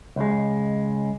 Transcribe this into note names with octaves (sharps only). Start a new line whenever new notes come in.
C#2 G#3